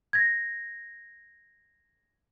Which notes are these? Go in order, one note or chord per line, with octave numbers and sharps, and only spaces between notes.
G#6 A#6